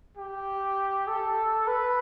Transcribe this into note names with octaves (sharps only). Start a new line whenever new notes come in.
G4
A4
B4